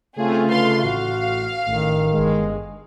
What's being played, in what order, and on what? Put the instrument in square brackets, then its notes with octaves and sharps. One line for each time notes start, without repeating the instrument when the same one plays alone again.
[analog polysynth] C#3 A3 F4 [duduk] C4 [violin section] G#4
[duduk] D3 [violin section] B4 F5 C6
[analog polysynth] A1 [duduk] F#4 [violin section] F5
[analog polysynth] A1 [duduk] D#3
[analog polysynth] G1 G#3